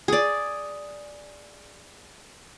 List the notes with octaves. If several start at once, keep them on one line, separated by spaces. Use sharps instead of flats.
G#4 D5